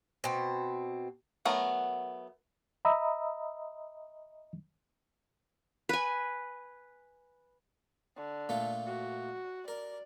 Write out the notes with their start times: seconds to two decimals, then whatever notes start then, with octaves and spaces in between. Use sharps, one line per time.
0.24 B2 C4
1.45 F#3 A3 B3 A#4
2.85 D#5 E5 A#5 B5 D#6 E6
5.89 B4 G#5
8.16 D3
8.49 A#2 A3 F4
8.86 F#4
9.68 A#4 D5